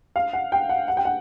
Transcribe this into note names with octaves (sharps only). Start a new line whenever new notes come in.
F5
F#5
G5
F#5
F#5
G5
F#5